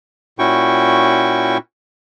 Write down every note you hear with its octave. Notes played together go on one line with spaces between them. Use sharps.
A#2 C#4 E4 F#4 G5 C#6